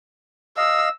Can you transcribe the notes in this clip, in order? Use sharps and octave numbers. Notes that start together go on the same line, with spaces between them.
D#5 F5 E6